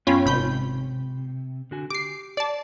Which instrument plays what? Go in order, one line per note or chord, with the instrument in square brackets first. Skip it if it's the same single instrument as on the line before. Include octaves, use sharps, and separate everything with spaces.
[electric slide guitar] F#2 B3 G5 [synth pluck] C#4 F4 B5
[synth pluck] G#1 B5 G6 [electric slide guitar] C3
[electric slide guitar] D3 F#4 G#5
[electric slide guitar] G4 [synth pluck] D6 C7
[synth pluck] D5 A5